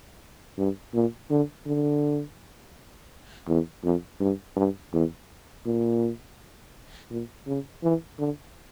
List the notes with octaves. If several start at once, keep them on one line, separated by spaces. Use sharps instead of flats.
G2
A#2
D3
D3
E2
F2
G2
G2
E2
A#2
A#2
C#3
E3
D3